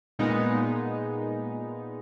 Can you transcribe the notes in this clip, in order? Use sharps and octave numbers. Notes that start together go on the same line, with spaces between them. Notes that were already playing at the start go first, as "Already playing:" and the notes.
A#2 G#3 B3 D#4